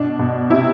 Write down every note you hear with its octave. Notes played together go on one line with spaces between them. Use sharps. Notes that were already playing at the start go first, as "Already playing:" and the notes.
Already playing: B2 D4
B2
C3 E4